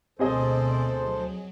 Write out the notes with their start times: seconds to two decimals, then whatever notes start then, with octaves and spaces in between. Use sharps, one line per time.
0.19 D2 B2 C4 G#4 A4 C5 D5 D#5
1.04 F#3